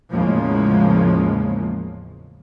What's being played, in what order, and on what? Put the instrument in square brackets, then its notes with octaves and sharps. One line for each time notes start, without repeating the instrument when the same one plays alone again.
[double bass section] E2 A2 C#3 F3 G#3 A#3